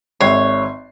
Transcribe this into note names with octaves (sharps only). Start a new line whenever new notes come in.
G#1 C#5 E5 C7